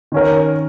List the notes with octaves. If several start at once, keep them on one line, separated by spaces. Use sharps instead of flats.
D#3 C#4 A#4